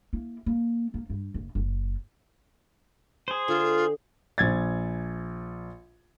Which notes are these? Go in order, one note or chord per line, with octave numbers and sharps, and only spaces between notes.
A#3 E4
A#3
A#3
G2
F#1
F#1
G#4 C5
D3 F4
A#1 G#6 A6